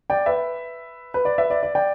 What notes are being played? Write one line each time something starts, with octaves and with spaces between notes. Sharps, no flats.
D5 G5
B4 E5
B4
D5
B4 E5
D5
D5
D5 G5